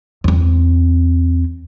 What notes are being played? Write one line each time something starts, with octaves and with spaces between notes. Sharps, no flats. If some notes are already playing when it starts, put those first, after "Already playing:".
E2 C4